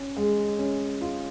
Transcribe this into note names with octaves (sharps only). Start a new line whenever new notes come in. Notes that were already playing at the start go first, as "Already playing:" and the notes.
Already playing: C#4
G#3
C#4
F4